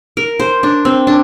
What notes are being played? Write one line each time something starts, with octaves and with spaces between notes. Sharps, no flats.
A#4
C5
D4
C4
D4